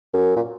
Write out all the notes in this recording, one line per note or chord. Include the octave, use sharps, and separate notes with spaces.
F#2
A#2